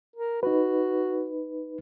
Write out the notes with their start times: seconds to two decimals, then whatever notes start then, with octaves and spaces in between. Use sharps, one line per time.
0.16 A#4
0.43 D#4 F#4 B4